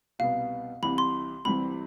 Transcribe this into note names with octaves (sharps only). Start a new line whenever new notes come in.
C2 B2 B3 F5
C2 C3 E3 B5
C6
C2 C3 E3 G3 C4 B5